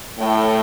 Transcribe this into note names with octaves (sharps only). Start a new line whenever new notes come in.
A2 G5